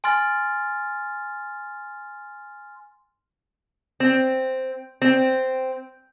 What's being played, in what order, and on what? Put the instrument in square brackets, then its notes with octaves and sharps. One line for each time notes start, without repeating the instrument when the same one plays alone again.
[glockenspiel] G#5 C6 F6 A6
[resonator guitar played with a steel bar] C4
C4